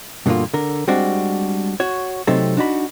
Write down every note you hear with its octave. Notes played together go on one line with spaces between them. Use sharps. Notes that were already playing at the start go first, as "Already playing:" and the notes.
G2 B2 D3 G3 A#3 F4
D3 A#4
G3 G#3 C4 D4 F#4
F#4 C#5
C3 F#3 A3 C4 D#4 A4
D4 D#4 F#4 B5